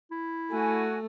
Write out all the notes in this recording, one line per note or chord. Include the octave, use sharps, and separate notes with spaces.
E4
A3 F#4 G#5